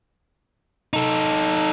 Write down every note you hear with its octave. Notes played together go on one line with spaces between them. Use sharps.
D#4 A4